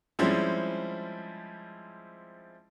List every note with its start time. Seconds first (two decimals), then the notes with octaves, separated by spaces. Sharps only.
0.19 F3 G3 G#3 C4 C#4 E4